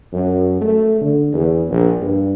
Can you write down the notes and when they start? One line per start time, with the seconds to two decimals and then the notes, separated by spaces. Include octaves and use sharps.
0.13 F#2
0.61 A3
1.01 D3
1.33 E2
1.69 A#1
2.01 G2